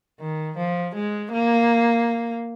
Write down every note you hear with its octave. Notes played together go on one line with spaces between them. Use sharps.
D#3
F3
G#3
A#3